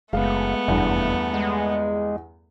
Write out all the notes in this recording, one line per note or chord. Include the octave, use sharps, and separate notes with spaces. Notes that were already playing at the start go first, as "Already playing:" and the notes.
F#1 G#3 A3 B3 F5
F1 E2 G2
G#3